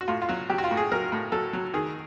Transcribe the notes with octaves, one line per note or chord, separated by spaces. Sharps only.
F#4
A2 F4
F4
F#3 F#4
F#3 G4
F#4
F4
A2
G#4
F#3 A#4
A2
F#3 A4
F#3
D#3 G#4